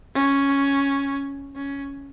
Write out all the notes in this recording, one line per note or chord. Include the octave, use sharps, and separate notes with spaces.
C#4
C#4